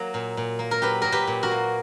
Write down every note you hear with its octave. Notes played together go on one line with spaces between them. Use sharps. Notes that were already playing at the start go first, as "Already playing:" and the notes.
Already playing: F#3 A#3
A#2
A#2
A#3
A#4
F#3 G4 B4
A#2 A#4
G4 B4
A#2
F#4 A#4
A#3